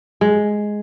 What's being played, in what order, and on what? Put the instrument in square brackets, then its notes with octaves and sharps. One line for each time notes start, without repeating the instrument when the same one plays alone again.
[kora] G#3